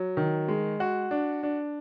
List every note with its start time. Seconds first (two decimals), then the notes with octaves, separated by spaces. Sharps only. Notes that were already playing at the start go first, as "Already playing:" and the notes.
Already playing: F#3
0.17 D#3
0.48 G#3
0.80 F#4
1.11 D4
1.43 D4